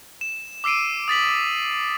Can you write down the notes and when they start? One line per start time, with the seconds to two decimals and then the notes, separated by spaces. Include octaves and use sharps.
0.21 E7
0.64 D6 E6 C7 D7 D#7
1.08 D#6 A6 B6 F#7